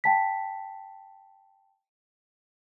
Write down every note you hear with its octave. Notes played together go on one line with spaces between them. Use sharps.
G5 A5 B6